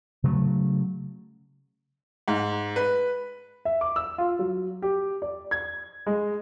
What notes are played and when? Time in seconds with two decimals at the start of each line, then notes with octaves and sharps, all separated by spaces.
0.24 C#3 F#3 A3
2.28 G#2
2.76 B4
3.65 E5
3.81 D6
3.96 E6
4.18 F4
4.39 F#3
4.82 G4
5.22 D5
5.51 G#6
6.07 G#3